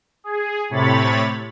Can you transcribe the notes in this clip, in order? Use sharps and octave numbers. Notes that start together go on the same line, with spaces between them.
G#4
A2 C3 C#5 B5 A6